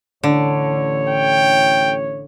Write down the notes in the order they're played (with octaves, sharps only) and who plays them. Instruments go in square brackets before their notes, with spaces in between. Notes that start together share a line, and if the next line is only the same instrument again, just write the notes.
[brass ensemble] A1 C#5 [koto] D3
[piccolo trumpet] G5